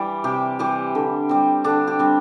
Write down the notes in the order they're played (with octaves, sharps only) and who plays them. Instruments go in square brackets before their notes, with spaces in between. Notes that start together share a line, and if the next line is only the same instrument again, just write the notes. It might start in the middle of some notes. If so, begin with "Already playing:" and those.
Already playing: [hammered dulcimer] E3 G3 D5
C3 G4
E3 G3 G4
D3
G3 C4
D3 D4
G4
G3 C4